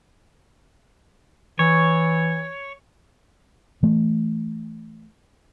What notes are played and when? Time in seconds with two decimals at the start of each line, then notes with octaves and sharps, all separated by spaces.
1.59 E3 C#5
3.83 E3 A3